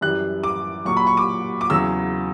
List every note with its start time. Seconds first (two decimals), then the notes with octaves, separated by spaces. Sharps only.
0.01 F#2 E3 G3 F#6
0.43 D6
0.85 A#2 F#3 C#6
0.97 B5
1.07 C#6
1.17 D6
1.61 D6
1.70 E2 C#3 F#3 E6